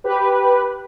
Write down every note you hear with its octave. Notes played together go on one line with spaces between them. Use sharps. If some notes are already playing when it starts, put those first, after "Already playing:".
G4 B4